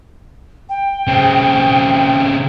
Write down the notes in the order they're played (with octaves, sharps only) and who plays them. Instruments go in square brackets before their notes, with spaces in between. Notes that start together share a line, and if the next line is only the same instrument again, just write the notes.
[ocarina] G5
[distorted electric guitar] C#3 C4